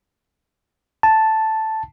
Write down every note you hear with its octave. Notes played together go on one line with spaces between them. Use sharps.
A5